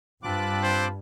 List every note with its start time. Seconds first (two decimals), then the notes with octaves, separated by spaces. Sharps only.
0.23 G2 C4 F4 A5 B5 D6 F#6
0.63 C5